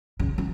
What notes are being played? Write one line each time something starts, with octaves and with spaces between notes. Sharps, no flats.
C#3
C#3